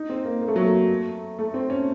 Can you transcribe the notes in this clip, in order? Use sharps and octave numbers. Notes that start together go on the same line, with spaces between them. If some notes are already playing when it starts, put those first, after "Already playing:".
Already playing: D#4
C4
A#3
A#3
A3
F#3
A3
A3
C4
C#4